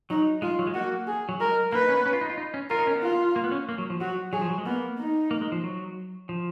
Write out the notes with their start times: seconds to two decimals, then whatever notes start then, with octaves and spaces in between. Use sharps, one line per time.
0.10 F#3 D#4
0.42 G#3 F4
0.59 F#3
0.67 G#3
0.74 A#3 F#4
1.07 G#4
1.29 F#3
1.40 G#3 A#4
1.72 A#3 B4
1.80 D#4
1.89 C#4
1.97 B3
2.06 C#4
2.13 F4
2.21 D#4
2.30 F4
2.38 D#4
2.54 C#4
2.70 F4 A#4
2.79 D#4
2.87 C#4
2.95 B3
3.03 F4
3.36 A#3
3.44 B3
3.51 C#4
3.69 A#3
3.78 F#3
3.90 F3
4.00 F#3 F#4
4.33 F#3 G#4
4.42 F3
4.49 F#3
4.58 G#3
4.65 A#3 B3
4.99 D#4
5.31 A#3
5.41 G#3
5.52 F3
5.64 F#3
6.29 F3